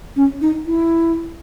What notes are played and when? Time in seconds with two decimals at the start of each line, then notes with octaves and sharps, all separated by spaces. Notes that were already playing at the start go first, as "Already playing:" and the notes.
0.16 C#4
0.41 D#4
0.66 E4